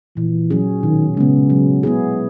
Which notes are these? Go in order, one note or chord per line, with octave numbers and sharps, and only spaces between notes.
A#2 E3
F#3 C#4 G#4
B2 D#3
C#3 G#3 B3
F#3
B3 E4 G#4